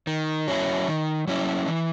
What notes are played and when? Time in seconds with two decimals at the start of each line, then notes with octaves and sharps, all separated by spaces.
0.07 D#3
0.48 F#3 C#4 E4
0.88 D#3
1.27 F#3 C#4 E4
1.68 E3